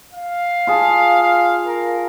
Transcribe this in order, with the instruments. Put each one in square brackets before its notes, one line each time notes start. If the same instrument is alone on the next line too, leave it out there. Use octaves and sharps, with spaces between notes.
[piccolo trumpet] F5
[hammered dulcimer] F4 G#4 A5
[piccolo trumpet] F5
A#4